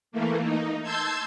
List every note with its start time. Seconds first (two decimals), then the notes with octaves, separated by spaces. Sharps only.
0.12 E3 A3 A#3
0.42 D#4
0.82 A5 C6 E6 G6 G#6